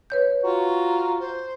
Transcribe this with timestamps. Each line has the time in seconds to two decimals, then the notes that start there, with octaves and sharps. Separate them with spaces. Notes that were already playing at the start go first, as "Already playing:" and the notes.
0.10 B4 C#5 G6
0.44 F4 F#4 A#5
1.20 C5